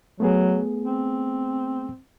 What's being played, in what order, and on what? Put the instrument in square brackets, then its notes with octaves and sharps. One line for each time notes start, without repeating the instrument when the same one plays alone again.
[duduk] F#3 [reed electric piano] A3 B3 G#4
[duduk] C4